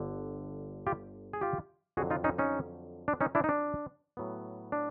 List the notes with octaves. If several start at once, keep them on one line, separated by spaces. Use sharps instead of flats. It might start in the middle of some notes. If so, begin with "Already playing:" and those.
Already playing: G1 G2 D3
F4 G4
G#4
F4 G4
F2 D3 F#3 F#4 G#4
D#4 F4
C#4 D#4
C#4 D#4
D4
C#4 D#4
D4 E4
D#4
D4
A2 F#3 B3
D4